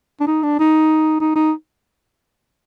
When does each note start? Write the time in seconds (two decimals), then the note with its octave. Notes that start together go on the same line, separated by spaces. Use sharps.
0.20 D4
0.27 D#4
0.43 D4
0.59 D#4
1.20 D#4
1.36 D#4